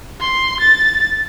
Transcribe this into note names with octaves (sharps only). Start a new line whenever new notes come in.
C6
A6